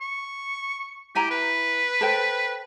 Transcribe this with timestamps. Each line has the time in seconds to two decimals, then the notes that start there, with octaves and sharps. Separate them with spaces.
0.01 C#6
1.15 E4 G4 G#5 A#5
1.31 B4
2.01 A4 C5 G5